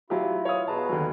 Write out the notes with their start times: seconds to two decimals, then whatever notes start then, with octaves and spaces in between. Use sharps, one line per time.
0.10 F#3 E4 F4 G4
0.45 C#5 F5 D#6
0.68 B2 G#4 B4 A5 A#5
0.89 D#2 D3 F#3